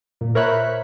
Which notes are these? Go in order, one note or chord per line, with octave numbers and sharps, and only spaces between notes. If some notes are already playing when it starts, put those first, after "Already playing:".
A#2
A#4 C5 C#5 E5 B5 F#6